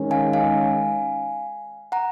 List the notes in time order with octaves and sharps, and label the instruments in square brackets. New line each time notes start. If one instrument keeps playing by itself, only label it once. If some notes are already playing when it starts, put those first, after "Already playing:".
Already playing: [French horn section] D#3 G#3 C#4
[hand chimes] F5 G#5
F5 G#5
F#5 A#5